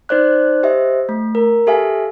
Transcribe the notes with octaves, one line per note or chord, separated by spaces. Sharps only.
D#4 C5 D5 F#6
G4 C5 D#5 E5
A3
A#4
G4 A4 E5 F5 G#5